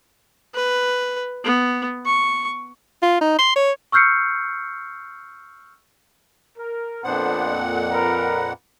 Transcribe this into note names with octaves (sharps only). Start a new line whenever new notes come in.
B4
B3
C#6
F4
D#4
C6
C#5
C#6 E6 F6 G6 C7 C#7
A#4
F2 A#2 B3 D4 C5 F#5
A#4 B4 A#5